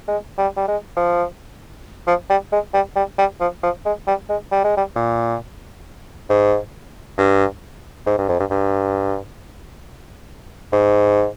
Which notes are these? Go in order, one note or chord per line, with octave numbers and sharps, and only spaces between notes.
G#3
G3
G3
G#3
F3
F3
G3
G#3
G3
G3
G3
F3
F3
G#3
G3
G#3
G3
G#3
G3
A#2
G#2
G2
G#2
G2
F2
G2
G2
G#2